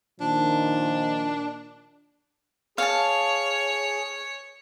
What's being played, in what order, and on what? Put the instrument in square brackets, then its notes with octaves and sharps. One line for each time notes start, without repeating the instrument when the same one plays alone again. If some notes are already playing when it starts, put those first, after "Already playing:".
[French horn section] A#2 D#3 [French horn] F3 [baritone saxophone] D4
[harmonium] G#4 [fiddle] C#5 [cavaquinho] F5 A5